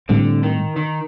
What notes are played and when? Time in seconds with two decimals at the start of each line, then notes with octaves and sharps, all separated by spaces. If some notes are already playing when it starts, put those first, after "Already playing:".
0.09 A2 D3 G3 C4
0.43 D#3
0.76 D#3